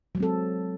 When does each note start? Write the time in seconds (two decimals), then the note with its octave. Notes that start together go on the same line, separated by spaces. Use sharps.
0.15 F#3
0.17 G#3
0.20 C4
0.23 A4